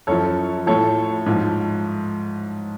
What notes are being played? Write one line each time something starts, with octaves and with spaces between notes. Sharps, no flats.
F#2 F3 A4 C#5
A2 F3 A4 C#5
G#2 F3